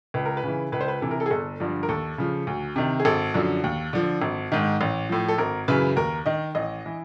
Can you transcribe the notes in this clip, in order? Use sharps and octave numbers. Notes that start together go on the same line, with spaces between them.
C#2 B4
A#4
B4
C#3 E3
C#2 B4
C5
B4
C3 E3 A4
A#4
A4
G#4
G1 A4
G2 D3 F3
A#4
D#2 A4
C#3 F3
D2
C3 D#3
G#4
G#1 A4
F#2 D3 F3
D#2
D3 F3
G#1
G#2 D#3
A1
A2 F3
A4
G#1 A#4
F#2 C#3 E3 B4
D#2 A#4
D#3 D#5
A1 D#5
E3